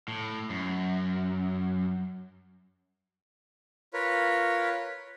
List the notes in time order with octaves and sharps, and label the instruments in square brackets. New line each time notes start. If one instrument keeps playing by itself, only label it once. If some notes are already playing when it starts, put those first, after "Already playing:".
[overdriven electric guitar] A2
F#2
[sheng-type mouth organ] F4 A#4 B4 C#5